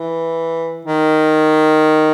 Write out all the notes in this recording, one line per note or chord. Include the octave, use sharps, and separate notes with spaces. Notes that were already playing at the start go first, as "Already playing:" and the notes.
Already playing: E3
D#3